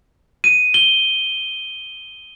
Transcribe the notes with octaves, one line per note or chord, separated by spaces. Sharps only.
D#7
G7